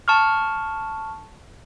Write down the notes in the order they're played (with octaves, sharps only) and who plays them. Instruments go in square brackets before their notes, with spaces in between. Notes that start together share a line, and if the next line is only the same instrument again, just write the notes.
[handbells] A5 C#6 F6